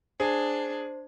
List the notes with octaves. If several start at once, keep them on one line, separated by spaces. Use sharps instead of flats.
D4 G#4 C5